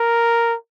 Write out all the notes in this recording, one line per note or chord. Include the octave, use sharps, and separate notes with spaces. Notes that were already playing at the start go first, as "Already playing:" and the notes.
Already playing: A#4